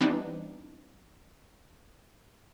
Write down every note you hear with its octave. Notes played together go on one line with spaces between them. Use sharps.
E3 G3 B3 C4 D4 D#4